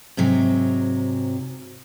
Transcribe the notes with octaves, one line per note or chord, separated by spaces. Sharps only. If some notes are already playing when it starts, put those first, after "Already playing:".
G#2 C3 F#3